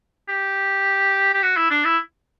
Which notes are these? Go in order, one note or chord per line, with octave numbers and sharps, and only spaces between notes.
G4
G4
F#4
E4
D4
E4